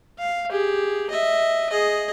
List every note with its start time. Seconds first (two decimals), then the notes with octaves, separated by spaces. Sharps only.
0.19 F5
0.51 G4 G#4
1.10 D#5 E5
1.70 G#4 D#5